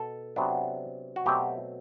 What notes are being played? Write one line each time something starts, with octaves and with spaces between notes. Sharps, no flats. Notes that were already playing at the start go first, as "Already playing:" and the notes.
Already playing: B2 A4
C3 F#3 B3 D4
F#4
B2 F#3 A3 C4 G4